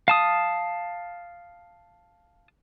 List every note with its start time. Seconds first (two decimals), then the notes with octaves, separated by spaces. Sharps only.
0.08 F5 A5 D#6